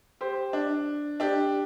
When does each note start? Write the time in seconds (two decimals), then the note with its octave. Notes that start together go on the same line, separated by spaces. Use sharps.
0.21 G4 C5
0.53 D4
1.20 D4 G4